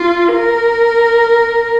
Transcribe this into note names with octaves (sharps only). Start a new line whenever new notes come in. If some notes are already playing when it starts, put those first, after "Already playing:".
Already playing: F4
A#4